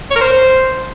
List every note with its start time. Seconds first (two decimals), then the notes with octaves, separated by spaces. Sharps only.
0.11 C#5
0.16 A#4
0.21 C5